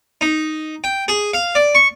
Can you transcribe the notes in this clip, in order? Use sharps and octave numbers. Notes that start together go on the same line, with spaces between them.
D#4
G5
G#4
F5
D5
C#6